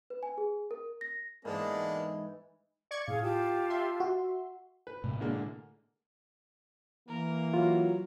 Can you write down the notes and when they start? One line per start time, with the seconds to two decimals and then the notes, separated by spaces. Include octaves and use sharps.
0.10 B4
0.23 G#5
0.38 G#4
0.71 A#4
1.01 A#6
1.45 G#2 E3 G#3 A#3 B3 D4 A4
2.91 D5 C#6 G#6
3.08 A2 G#4 F5
3.22 F4 G4 A5
3.70 E5 C6
4.00 F#4
4.87 B4
5.04 A2 C3 A3
5.21 D3 G#3 A#3
7.08 E3 A#3 A#4
7.54 F#3 F4